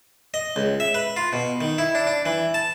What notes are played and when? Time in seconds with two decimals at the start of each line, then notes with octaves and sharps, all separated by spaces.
0.34 D#5
0.56 C#2
0.80 E5
0.94 B4
1.17 F4
1.33 B2
1.61 D#3
1.78 E4
1.95 D4
2.07 D4
2.26 E3
2.54 A5